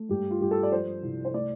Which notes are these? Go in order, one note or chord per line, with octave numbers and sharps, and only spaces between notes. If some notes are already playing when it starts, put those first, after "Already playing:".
Already playing: A3
G2 G4
F4
G2 G4
A4
D5
F3 C5
C2
C5
A3 D5